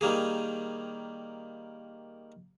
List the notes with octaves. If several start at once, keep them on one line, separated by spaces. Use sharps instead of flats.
D#3 G3 A#3 G#4